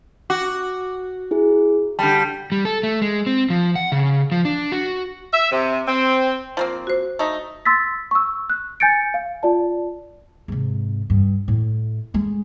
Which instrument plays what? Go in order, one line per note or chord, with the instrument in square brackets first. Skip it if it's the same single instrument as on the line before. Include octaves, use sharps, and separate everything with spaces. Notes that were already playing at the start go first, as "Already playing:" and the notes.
[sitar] F#4 [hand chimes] D6
[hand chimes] E4 G#4
[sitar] D3 G3 [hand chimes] A5 G6
[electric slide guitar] G3
A4
A3
G#3
C4
F3
F#5
C#3
F3
D4
F#4
[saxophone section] E5
C3
C4
[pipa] F3 A#3 C4 [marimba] F5
[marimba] F#4 C5
[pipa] A3 D#4
[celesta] C6 E6 A6 B6
C#6 E6
F#6
G#5 G6 A6 C#7 D7
F5
F4 D5 A5
[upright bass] G#2 C3
G2
A2
G#3 A3